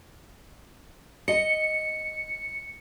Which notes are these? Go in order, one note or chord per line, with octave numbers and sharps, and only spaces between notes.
D#5 C#7